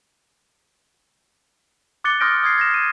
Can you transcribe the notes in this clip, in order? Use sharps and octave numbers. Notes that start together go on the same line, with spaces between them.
D6 F#6 A6 C#7 G7
C6 D#6 F6 G6 A#6 D7
D#6 G#6 C7
G#6 A#6 E7
D#7